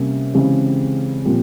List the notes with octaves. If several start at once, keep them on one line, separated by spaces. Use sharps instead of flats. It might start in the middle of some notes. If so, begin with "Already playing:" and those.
Already playing: C3 G3 A#3 C#4
C#3 E3 G#3 C4 G4
A#2 F3 C4 G4